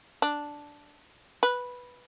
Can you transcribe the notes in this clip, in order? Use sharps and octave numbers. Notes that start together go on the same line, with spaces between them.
D4
B4